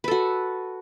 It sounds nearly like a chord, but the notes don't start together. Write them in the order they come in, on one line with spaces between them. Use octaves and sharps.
B4 A4 F#4